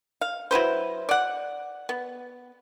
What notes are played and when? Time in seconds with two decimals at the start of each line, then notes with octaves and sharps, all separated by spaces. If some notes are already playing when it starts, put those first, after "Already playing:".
0.21 F5
0.51 F#3 E4 B4 C5
1.09 D5 F#5
1.89 B3